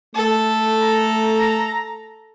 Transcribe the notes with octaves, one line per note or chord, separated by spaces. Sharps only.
A3 A4
A#5